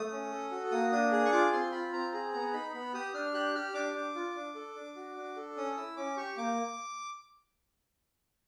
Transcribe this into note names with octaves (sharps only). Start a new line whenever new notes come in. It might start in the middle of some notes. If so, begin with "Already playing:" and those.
Already playing: A3 D#6
C#4
A4
F#4
A#3 D#6
D4 D#6
G#4 D#6
C#6
F4 D6
C4 C6
F4 B5
C4 A#5
G#4 A#5
B3 A#5
D#4 B5
B3 B5
G4 D#6
D4 F6
G4 F#6
G4 F6
D4 D6
D4
F4
D4
A4
D4
F#4
D4
A4
C#4 D#6
E4 E6
C#4 D6
G4 C#6
A#3 D6